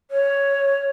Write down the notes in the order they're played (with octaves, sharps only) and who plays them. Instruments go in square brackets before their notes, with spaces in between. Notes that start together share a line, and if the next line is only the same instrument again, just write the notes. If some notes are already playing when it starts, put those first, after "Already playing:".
[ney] C#5